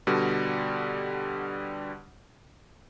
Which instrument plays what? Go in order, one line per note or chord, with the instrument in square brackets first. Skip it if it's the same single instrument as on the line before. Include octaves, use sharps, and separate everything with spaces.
[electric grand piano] B2 D3 G3